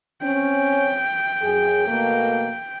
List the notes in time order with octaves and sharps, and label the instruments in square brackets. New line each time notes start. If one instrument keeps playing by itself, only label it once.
[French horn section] C4 C#4 [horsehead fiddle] G5
[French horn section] F#2 G#4
B2 A3 A#3